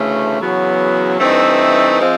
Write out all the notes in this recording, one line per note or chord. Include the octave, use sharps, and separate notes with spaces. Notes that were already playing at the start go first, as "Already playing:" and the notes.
Already playing: D2 C#3 E3 A3
E2 C#3 F#3 B3
G2 E3 A3 C4 D#4
F3 G#3 C4